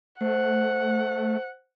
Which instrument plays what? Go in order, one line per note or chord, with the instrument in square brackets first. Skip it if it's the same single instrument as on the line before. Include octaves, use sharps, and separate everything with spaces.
[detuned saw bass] A3 [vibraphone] C5 [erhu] F#5